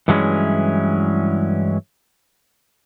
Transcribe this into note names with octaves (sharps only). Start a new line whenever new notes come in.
G2 E3 F#3 G#3 C#4 E4